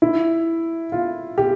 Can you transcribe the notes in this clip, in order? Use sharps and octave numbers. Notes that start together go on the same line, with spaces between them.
E4
F4
G4